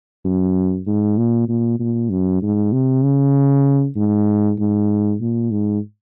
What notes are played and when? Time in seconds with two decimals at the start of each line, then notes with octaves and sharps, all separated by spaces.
0.25 F#2
0.87 G#2
1.18 A#2
1.49 A#2
1.80 A#2
2.10 F#2
2.42 G#2
2.73 C3
3.04 C#3
3.96 G#2
4.59 G#2
5.21 A#2
5.51 G#2